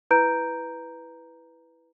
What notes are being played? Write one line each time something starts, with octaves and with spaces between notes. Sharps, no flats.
E4 B4 A#5 G6 D7